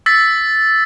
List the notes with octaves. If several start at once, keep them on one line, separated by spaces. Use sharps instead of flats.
E6 A6 B6